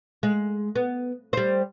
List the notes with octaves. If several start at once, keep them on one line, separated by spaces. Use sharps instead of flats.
G#3
B3
G3 C5